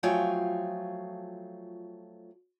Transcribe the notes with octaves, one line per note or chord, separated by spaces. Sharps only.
F3 F#3 A3 F4 G5 G#5